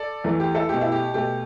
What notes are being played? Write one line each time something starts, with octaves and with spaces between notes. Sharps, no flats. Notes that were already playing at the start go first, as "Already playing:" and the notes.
Already playing: A4 D5
E2 E3 A3
G4
E4 A4
B2 A3 G4
E4
G4
B2 A3 G4